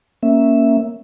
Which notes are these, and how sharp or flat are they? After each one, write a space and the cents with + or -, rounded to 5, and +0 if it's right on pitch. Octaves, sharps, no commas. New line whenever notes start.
A#3 +0 C#4 +0 E5 +0